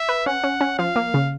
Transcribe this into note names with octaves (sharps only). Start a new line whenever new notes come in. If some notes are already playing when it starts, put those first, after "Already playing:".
Already playing: E5
B4
C#4 F#5
C#4
C#4
F3 F5
A#3
C#3